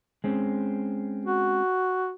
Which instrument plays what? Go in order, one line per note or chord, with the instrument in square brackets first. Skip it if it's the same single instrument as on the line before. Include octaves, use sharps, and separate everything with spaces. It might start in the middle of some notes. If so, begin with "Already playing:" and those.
[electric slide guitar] G#3 C4 C#4
[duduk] F#4